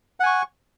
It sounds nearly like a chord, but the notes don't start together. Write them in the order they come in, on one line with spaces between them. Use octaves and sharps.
F#5 G#5 C#6